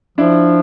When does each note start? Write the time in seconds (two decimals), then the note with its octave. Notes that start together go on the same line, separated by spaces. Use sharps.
0.18 F3 D4 E4